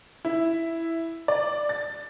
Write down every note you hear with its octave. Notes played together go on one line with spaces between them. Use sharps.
E4
D5
A6